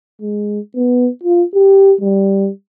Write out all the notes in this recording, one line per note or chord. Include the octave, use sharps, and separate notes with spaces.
G#3
B3
F4
G4
G3